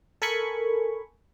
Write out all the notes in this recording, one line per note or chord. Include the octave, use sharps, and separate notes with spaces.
A4 A#4 G#5 B5 C#6